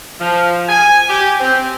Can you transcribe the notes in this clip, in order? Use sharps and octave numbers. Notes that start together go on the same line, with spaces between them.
F3
G#5
G4
C4